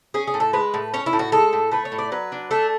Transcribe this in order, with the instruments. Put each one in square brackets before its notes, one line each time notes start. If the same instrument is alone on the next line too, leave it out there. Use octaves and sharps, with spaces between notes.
[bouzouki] C#4 G#4
G#4
A2
A4
G#3 B4
A2
C#4 C#5
E4
A2
F#4
G#3 A4
A2
A3 B4
C#5
A2
D5
F#3 B4
D4
A3 A4